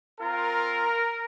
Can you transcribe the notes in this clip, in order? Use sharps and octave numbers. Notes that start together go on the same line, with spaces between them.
C4 F4 A#4